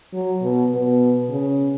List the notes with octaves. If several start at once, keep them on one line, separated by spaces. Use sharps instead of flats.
F#3
B2
B2
C#3